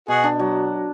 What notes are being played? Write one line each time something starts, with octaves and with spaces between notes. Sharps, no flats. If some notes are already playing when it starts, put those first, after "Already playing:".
B2 F#4 G#4
D4
F#3